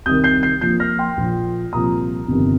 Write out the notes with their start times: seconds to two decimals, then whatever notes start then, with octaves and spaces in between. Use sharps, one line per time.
0.06 C2 C3 D#3 D#6 G6
0.24 G6 C7
0.43 G6 C7
0.61 A#1 A#2 F3 G6 C7
0.80 F6 A#6
0.99 G5 C6
1.17 A#1 A#2 F3
1.73 C2 A#2 F3 A#5 D#6
2.28 G1 F2 C3 D#3